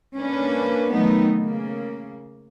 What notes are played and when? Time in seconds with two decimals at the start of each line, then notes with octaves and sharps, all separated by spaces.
0.18 A#3 C#4 D4 B4
0.91 D#3 F#3 A3 B3 D#4
1.37 C#3 A#3